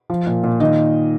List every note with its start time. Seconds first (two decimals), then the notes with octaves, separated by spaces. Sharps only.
0.10 F3
0.27 A#2
0.44 A#2
0.60 D#3 D#5